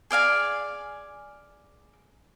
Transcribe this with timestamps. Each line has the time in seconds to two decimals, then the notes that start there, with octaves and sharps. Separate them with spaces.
0.11 G#4 D5 F5 G#5